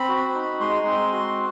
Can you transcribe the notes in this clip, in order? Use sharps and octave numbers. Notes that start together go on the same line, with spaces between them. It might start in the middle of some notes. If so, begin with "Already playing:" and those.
Already playing: C4 B5
F#4
D#4
G#3 C6
C4
F#4